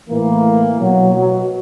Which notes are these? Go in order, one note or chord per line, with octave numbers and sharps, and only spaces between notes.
A2 E3 A#3
B2 F#3
F#3